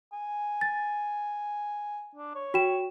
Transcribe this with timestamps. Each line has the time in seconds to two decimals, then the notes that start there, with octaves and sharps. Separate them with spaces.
0.12 G#5
0.61 A6
2.15 D4
2.35 C#5
2.54 F#4 G5 E7